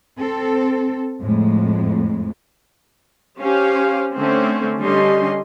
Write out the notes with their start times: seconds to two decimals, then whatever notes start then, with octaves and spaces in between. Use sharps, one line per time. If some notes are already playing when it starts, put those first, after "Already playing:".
0.19 C4 A4
1.22 F2 A2 G#3
3.40 C#4 G4 C5 F5
4.17 D3 A3 C4 C#4
4.80 D3 G3 C#4 G4 D#5 C6